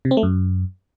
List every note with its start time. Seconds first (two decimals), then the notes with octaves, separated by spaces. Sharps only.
0.05 C3
0.11 C4
0.17 A3
0.23 F#2